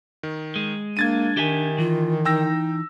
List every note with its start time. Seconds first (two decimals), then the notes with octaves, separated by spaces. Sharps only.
0.23 D#3
0.56 G#3
0.97 A#3 D4 G#6 A6 D#7
1.37 D#3 G4 E5 G#5
1.78 E3 F4
2.25 D#4 G5 E6 A#6